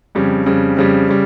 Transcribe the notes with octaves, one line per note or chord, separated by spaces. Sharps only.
F2 C#3 G3
F2 C#3 G3
F2 C#3 G3
C#3 G3